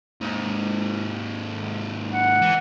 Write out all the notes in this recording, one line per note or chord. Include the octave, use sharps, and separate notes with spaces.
D#2 G#2
F#5
E3